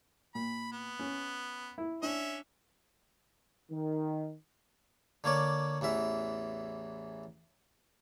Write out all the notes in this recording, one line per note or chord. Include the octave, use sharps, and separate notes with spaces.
A#2 B5
B3
C#4
E4
C#4 D4 E5
D#3
D3 A#3 C#5 D5
A1 E2 E3 E5